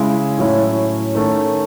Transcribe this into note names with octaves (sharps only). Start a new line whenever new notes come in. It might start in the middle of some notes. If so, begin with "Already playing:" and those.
Already playing: C#3 G#3 C#4 E4
A2 F#3 C#4 E4
D#3 A3 C#4